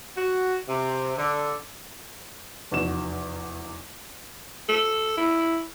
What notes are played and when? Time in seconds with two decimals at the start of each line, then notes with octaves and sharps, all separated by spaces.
0.16 F#4
0.68 C3
1.16 D3
2.71 F1 E2 F#4 E7
4.69 A4
5.17 E4